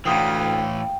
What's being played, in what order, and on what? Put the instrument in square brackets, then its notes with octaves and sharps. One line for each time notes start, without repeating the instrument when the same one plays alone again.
[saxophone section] D2 [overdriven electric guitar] A2 E3 [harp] F5 D#6 C7 [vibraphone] G5